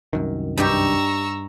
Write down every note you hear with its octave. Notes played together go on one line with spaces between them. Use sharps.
C2 F#2 D#3
G2 D#4 G4 A#5 C#6 E6